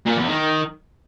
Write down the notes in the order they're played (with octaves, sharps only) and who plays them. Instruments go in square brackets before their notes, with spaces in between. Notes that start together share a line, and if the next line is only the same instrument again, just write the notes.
[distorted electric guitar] A#2
E2
D#3